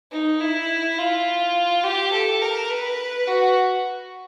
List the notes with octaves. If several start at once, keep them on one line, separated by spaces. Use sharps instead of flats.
D#4
E4
F4
G4
A4
A#4
B4
F#4